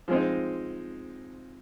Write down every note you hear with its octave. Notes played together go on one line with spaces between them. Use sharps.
F3 G#3 C4 D#4